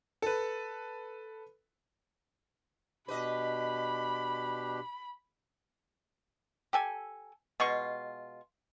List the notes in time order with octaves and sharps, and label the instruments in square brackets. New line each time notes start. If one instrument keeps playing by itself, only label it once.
[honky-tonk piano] A4 B4
[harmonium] B2 D4 G4 [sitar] B4 D#5 [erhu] B5
[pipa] G4 A4 G#5
B2 G#3 F4 C#6